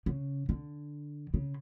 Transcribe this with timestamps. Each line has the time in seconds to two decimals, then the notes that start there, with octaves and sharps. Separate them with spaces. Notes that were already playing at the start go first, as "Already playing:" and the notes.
0.06 C#3
0.49 D3
1.34 C#3